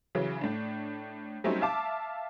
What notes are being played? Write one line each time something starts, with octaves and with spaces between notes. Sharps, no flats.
C#3 E3 F#3
A2 D4
F#3 G3 A3 C4 C#4 D#4
E5 F5 A5 D6